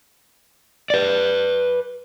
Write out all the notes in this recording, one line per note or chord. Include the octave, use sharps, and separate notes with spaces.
B4 D5